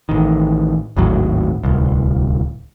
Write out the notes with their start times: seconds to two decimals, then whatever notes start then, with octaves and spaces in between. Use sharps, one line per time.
0.09 A1 D#3
0.97 G#1 D#2 A2 F#3
1.64 D1 C2